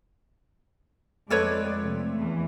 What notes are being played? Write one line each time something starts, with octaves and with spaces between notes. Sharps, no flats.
F2 G#3 A4 B4 C#5 D5
C3 F3 A3
E2 E3